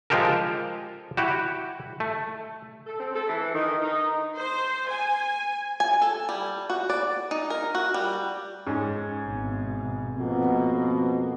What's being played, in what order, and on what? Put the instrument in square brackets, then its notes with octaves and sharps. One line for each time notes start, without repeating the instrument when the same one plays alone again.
[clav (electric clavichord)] F3 G#3 F4 G4 A4 A#4
E4 F#4 G4
A3
[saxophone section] A4
C4
A4
E3
D#3
D#4
[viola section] C5
G#5
[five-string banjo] G#5
A4
G3
F#4
D5
D#4
A#4
F#4
G3
[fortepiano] G#2 C#4
[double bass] G#1 B2
[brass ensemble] F2 B2 [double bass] A#3